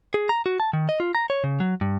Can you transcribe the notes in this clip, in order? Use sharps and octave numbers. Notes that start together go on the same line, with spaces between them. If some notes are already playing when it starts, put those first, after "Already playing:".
G#4
A#5
F#4
A5
D#3
D#5
F4
A#5
C#5
C#3
F#3
G2